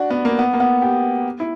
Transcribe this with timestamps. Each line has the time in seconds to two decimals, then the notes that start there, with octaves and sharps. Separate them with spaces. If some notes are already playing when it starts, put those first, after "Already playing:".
Already playing: D4 F#4
0.10 B3
0.25 A#3
0.39 B3
0.54 A#3
0.60 B3
0.82 G4
1.40 E4